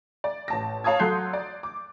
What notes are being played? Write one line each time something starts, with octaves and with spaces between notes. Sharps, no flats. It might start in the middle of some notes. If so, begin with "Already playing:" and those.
D5
A1 A5 A#6
C#5 F5 A5 D#6 G#6
F#3 A4 C6 F#6 G6 C7
D5
D6